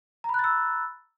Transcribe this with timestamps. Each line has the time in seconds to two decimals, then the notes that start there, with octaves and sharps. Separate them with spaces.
0.24 A#5
0.29 B5
0.34 F#6
0.39 A6
0.44 E6